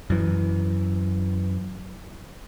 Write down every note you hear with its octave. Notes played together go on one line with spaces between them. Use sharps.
F#2 E3